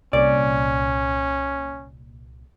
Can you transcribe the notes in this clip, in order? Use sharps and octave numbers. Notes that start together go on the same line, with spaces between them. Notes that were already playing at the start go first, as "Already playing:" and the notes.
C2 A#2 C#4 D5